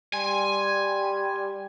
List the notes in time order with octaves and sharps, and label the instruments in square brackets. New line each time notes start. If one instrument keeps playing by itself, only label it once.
[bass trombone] G3 [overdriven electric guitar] G#5 [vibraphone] C6